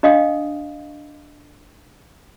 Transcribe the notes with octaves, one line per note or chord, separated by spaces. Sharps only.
D4 D#5 F5 G5 D#6